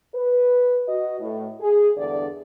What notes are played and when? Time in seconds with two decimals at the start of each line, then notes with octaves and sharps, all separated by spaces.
0.14 B4
0.88 F#4 D#5
1.20 A2
1.60 G#4
1.97 E2 G2 D3 D5